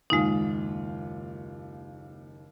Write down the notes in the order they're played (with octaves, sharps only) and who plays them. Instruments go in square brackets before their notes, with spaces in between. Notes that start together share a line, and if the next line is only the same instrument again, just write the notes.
[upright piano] F#1 D#2 F4 [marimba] G#3 D#4